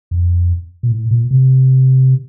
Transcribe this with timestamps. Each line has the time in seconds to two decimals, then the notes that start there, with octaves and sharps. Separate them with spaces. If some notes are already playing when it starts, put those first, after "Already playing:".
0.11 F2
0.83 A#2
0.92 A2
1.11 A#2
1.31 C3